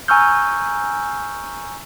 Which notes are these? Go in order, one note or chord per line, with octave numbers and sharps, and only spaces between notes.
G#5 A#5 C#6 E6 F6 G6